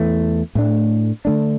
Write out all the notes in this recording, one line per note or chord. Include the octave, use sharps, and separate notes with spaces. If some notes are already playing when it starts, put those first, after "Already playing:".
Already playing: E2 E3 A3
A2 A3 D4
D3 A3 D4